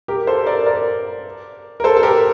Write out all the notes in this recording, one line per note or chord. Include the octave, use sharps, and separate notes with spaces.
G4 A#4
A4 C5
A#4 D5
A#4 D5
A#4
A4 C5
A4
G4 A#4